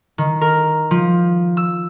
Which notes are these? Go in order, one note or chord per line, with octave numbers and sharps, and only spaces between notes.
D#3
A#4
F3
E6